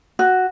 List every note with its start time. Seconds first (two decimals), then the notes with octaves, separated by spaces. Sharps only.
0.19 F#4